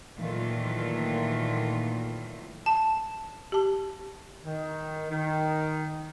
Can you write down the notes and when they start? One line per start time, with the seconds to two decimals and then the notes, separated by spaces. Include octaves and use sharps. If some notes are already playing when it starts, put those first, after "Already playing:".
0.17 A#2 D#3 E3 F#3 A3 F4
2.66 A5
3.52 G4 A5
4.45 D#3
5.11 D#3